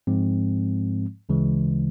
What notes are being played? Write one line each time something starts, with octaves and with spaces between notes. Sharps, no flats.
G#2 F3 G#3 C4
D2 C#3 E3 G#3